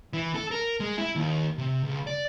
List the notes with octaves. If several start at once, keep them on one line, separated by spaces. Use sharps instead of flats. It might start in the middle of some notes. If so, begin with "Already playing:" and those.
E3
A4
A#4
G#3
E4
D#2
C3
C#2
D5